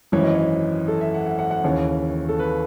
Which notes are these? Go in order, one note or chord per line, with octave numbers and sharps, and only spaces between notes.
G#1 F#2 E3 C#5
D#5
C#5
A4
E5
F#5
F#5
F#5
F#5
D#2 C#3 E3 C#5
A4
B4